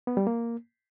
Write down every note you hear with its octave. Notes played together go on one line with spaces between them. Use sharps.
B3
G3
A#3